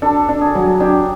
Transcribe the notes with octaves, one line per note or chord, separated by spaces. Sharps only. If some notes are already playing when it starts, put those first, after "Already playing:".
D4 A4
D4
G#4
F#3
D4 G4